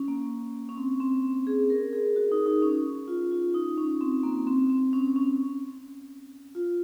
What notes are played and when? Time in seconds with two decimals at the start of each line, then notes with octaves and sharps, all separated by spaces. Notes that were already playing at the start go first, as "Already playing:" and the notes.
Already playing: C#4
0.08 A#3
0.69 C#4
0.77 C4
1.00 C4
1.47 G#4
1.70 A#4
1.93 G#4
2.16 F#4
2.32 D#4
2.46 D#4
2.62 C#4
3.08 F4
3.31 F4
3.54 D#4
3.77 C#4
4.01 C4
4.23 A#3
4.47 C4
4.69 C4
4.93 C#4
5.16 C#4
6.55 F4